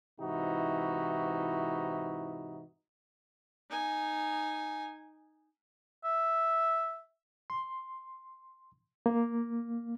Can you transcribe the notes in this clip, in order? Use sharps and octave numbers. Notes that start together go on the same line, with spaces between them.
G#2 C3 E3 D#4 E4 F#4
D#4 G#5
E5
C6
A#3